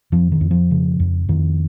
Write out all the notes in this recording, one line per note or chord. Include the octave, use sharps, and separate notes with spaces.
F2 F3
D#3
F2
F3
C#3
F2
F2 D#3